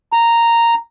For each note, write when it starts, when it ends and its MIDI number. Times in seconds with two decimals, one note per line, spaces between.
0.13 0.74 82